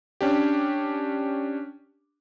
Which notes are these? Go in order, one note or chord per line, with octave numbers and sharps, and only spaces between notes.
C#4 D4 G4